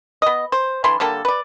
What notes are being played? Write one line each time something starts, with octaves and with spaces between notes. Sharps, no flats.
B3 D#5
C5
D3 E3 E4 C6
D3 G3 A#3 A4
B4 D5